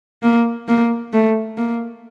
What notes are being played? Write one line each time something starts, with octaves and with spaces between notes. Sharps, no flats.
A#3
A#3
A3
A#3